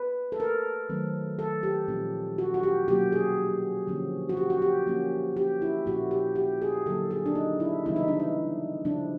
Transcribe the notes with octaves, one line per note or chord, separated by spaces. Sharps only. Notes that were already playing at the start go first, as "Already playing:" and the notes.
Already playing: B4
A4
A#4
D#3 F#3 A3 C4
A4
G4
A#2 F3 G#3 C#4
F#4
F#4
G4
B2 F#3 A#3 C#4 G4
G#4
D3 F3 A#3 C#4
F#4
G4
F#4
G4
F3 A#3 C#4
G4
E4
A#2 F3 A#3 C#4 F#4
G4
G4
G#4
D3 F#3 A#3 A4
G#4
D4
D#4
E4
C#3 E3 G3 B3 E4
D#4
D4
D#4
C#3 F3 G#3 C4 D4